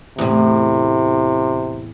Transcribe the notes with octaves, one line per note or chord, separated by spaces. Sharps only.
E2 A2 C3